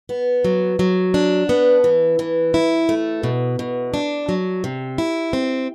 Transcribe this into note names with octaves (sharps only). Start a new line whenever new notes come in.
B3
F#3
F#3
D4
B3
E3
E3
E4
A3
B2
B2
D4
F#3
C3
E4
C4